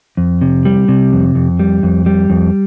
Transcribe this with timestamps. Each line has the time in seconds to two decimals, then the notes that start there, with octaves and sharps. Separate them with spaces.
0.17 F2
0.41 C3
0.65 G3
0.88 C3
1.12 F2
1.35 F2
1.59 G3
1.83 F2
2.06 G3
2.30 F2